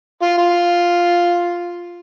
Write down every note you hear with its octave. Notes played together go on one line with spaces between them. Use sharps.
F4
F4